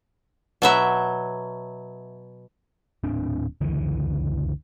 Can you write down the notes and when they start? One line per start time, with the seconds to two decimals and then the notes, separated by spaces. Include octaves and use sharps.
0.62 B2 F#3 E5
3.03 D#1 A2 C4 D4
3.61 F#1 C#2 D3 E3